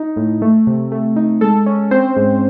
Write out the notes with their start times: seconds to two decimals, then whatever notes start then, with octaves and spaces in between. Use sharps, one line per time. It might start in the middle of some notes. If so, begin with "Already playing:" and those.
Already playing: D#4
0.16 A2
0.42 A3
0.67 C3
0.92 A3
1.16 D#4
1.41 G#3 A4
1.66 C#4
1.91 C4 C5
2.17 G#2